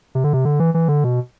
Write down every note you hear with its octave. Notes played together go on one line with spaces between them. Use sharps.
C3
D3
C3
D3
E3
E3
D3
B2